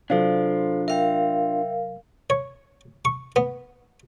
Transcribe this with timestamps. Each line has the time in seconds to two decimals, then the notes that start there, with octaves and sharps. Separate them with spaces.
0.10 C3 F#3 D4 F4 A4 C5 F5
0.88 A#4 E5 F5 G5
2.30 C#5
3.05 C#6
3.36 B3